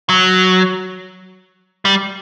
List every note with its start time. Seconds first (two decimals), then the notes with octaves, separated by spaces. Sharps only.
0.09 F#3
1.85 G3